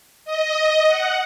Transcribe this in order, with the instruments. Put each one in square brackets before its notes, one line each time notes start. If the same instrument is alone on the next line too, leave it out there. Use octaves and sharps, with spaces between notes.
[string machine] D#5
F#5